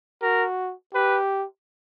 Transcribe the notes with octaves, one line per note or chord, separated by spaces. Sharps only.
F#4 A#4
G4 B4